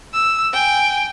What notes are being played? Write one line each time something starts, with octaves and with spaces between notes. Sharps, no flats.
E6
G5 G#5